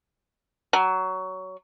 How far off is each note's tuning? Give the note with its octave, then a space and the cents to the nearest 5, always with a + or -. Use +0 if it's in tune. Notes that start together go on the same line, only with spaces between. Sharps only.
F#3 +15